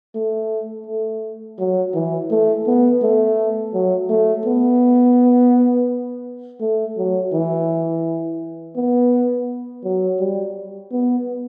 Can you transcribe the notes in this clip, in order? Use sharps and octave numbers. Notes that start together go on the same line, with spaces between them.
A3
A3
F#3
E3
A3
B3
A3
F#3
A3
B3
A3
F#3
E3
B3
F#3
G3
B3